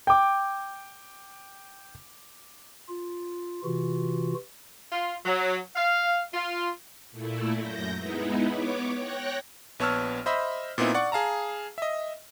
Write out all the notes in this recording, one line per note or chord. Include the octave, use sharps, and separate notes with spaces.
G5 D6
F4
C3 E3 F4 F#4
F4
F#3
F5
F4
A#2 A3 E4
F#2 G6 A#6
G#3 B3 D#4 E4
B3 C#5 D6
C#5 G5 F#6 A#6
A#1 B3 C#5 A5 E6 F6
C5 D#5 E5 B5
A#2 B3 C4 D#4 E4
D5 F#5 C#6
G#4 F5 A5 A#5
D#5 E5